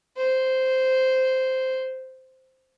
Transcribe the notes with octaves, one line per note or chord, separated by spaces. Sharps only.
C5